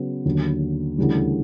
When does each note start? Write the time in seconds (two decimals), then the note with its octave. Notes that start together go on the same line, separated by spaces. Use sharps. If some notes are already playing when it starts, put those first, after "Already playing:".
Already playing: C#3 F#3 B3
0.25 D#2 D3 F#3
0.98 D2 C#3 E3 G3